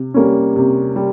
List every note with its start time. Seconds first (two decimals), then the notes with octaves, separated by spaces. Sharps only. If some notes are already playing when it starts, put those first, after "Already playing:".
Already playing: C3
0.14 G3 A#3 C#4
0.56 C3
0.96 G3